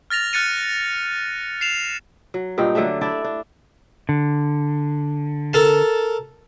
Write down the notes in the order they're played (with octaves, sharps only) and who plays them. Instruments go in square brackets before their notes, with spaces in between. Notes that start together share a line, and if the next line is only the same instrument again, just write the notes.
[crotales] F6 A6 A#6 F7
F6 F#6 A6 C#7 D#7
C7 E7 F7
[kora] F#3
G2 A#2 D#4 G5
D3 F#3 A3 D4
D4 E4 D5
D4
[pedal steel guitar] D3
[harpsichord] A4 A#4 A5